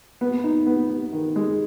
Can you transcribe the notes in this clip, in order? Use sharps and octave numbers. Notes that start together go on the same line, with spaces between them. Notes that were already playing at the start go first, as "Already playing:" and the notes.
B3
D#4
B3
B3
D#3
G#3